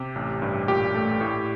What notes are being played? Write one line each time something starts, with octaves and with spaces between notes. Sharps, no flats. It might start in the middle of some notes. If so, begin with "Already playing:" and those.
Already playing: C3 G4
A1
G2
A#2 G4
A3
A2